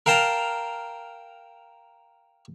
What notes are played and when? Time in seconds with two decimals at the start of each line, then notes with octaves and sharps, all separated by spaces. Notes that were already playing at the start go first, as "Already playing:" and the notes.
0.06 A#4 F5 G5 A5 A#5